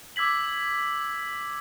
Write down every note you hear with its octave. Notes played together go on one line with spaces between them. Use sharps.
D6 E6 G#6 B6 F#7